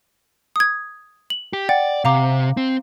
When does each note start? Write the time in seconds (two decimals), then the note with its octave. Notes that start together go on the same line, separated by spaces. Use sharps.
0.56 D#6 G#6
1.30 F#7
1.53 G4
1.69 D5 F#5 G5 A6
2.05 C3 F5 A#5 D6
2.57 C4